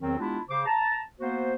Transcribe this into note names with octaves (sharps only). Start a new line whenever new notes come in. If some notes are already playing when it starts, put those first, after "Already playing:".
E2 D#3 F#3 C4
G#3 B3 D4 E4 F4 G4
C#3 C5 D6
A5 A#5
A#3 B3 F#4 C5